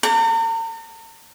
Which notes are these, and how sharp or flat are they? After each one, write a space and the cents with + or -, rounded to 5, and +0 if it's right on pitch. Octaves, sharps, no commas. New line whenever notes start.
A#5 -45